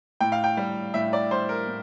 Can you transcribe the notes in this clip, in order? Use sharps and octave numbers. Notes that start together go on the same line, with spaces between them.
A2 G5
F5
G5
G3
A2 E5
D5
G3 C5
A#4
A2